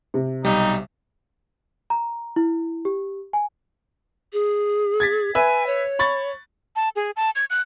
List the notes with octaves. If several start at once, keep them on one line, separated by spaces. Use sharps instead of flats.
C3
B1 G3 D#4
A#5
E4
G4
G#5
G#4
G#6 A6 B6
B4 E5 G#5
C#5
B5 C#6 A6
A5
G#4
A5
G#6
F#6